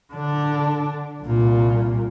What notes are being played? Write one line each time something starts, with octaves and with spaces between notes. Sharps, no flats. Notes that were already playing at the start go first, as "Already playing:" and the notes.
D3 D4
C2 A#2